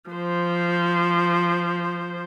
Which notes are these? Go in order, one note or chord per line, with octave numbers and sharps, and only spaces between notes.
F3 C5